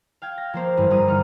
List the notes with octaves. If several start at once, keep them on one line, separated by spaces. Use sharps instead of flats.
F5 G5 G#6
A#6
F3 A#3 C5
G#1 G2 E3
G2 E3 G3 A#5 D#6
D3 D#4 F6